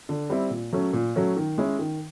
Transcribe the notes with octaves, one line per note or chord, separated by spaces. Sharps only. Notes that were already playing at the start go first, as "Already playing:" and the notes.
D3
G3 C4 E4
A#2
F#3 A3 C#4
A#2
F#3 A3 C#4
D#3
G#3 C#4 E4
D#3